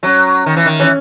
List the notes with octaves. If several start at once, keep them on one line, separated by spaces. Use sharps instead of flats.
F#3 C#4
D#3
E3
D#3
E3 C#4